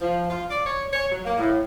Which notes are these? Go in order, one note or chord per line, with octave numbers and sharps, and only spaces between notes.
F3
F4
D5
C#5
C#5
F#3
A#3
A2